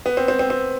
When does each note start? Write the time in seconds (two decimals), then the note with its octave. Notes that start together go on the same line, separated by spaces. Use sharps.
0.06 B3
0.17 C4
0.28 C4
0.39 C4
0.50 C4